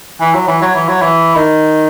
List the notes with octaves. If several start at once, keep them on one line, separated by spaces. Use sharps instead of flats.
E3
F#3
E3
F#3
E3
F#3
E3
D#3